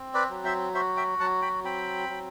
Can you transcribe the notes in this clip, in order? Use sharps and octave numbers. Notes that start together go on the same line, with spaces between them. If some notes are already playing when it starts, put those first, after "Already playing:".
Already playing: C4
B4 D5
F#3
C5 E5
F#4 C5 E5
E5 G5
F#3 F#5 A5
G5 B5
C4 G5 B5
F#3